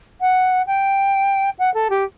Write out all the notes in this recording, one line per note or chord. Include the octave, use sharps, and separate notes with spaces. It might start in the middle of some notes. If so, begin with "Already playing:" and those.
F#5
G5
F#5
A4
G4